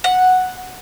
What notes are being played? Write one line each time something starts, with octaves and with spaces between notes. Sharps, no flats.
F#5